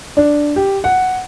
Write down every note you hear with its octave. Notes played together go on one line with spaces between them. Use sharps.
D4
G4
F#5